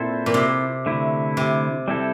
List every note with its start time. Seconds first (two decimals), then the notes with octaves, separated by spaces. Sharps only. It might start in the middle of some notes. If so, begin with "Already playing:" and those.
Already playing: A#2 C4 E4 A4 C5
0.26 A#2
0.34 C3
0.86 D3 A3 E4
1.37 C3
1.88 G3 C4 E4 A4